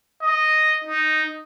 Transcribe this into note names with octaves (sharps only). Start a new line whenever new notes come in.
D#5
D#4